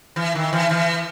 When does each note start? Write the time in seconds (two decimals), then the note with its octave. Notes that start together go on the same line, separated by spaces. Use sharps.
0.16 E3
0.35 D#3
0.53 E3
0.71 E3